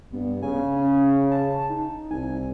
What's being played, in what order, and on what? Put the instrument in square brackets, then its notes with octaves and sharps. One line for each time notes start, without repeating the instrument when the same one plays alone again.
[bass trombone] G2 [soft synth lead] B3
[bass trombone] C#3 [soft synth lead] G#5
[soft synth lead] C#4
A5
D#4
[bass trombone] C2 [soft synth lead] G#5